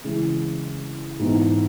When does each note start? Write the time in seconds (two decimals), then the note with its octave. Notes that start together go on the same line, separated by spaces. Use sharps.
0.04 C#3 E3 G#3
1.19 G#2 E3 B3 D#4